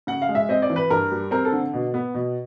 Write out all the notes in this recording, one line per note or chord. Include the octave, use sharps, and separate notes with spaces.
C#3 F#5
F5
G#3
E5
C4 D#5
D5
E3
B4
G2 A#4
G3
C4 A#4
A4
D3
B2
B3
B2